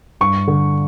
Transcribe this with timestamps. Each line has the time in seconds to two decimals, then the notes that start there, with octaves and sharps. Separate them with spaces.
0.21 G2 C#6
0.47 D3